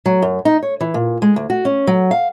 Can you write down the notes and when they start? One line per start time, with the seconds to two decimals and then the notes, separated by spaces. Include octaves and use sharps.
0.06 F#3
0.22 F#2
0.45 D#4
0.63 C#5
0.81 E3
0.94 A#2
1.22 G#3
1.36 D2
1.50 F#4
1.65 C#4
1.87 F#3
2.11 F5